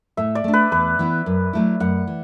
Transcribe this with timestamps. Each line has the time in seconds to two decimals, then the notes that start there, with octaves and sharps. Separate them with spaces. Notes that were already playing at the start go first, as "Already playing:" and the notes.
0.17 A2 E5
0.35 D5
0.44 A3 D4
0.54 B4
0.72 E2 B4
0.99 E3 B3 E4
1.26 F#2
1.53 F#3 A3 E4
1.80 F#2 F#5
2.07 E3